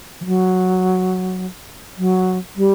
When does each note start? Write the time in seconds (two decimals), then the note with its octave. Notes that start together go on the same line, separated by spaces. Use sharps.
0.21 E3
0.25 F#3
1.98 F#3
2.56 G3